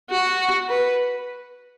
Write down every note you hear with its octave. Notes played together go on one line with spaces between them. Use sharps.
F#4
B4